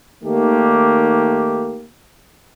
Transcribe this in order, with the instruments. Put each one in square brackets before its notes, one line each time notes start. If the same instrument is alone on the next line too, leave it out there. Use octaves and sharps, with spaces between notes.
[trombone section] D#2 D#3 A3 A#3 G4